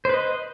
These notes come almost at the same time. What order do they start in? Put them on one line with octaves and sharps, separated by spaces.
C5 B4 D#5